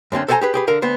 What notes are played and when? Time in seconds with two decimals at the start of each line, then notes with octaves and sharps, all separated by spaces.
0.12 F#2 D3 C4 C#4
0.28 A4 C5 D5 F#5 G#5 A#5
0.41 G4 G#4 B4
0.54 G4 G#4 B4
0.67 D3 A#4 F5
0.82 D2 B3 C5